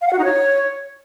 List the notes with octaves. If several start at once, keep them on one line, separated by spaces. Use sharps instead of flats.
F5
F#5
F#4
D#4
C#5